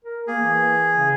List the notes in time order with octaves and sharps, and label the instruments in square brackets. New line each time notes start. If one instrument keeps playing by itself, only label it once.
[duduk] A#4
[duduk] A#3 [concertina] G#4
[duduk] E3
C#3